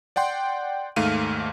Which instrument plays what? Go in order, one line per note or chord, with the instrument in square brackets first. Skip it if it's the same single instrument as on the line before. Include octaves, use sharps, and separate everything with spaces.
[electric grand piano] D5 F#5 G5 C6
D#2 G#2 A3 F5 F6 D#7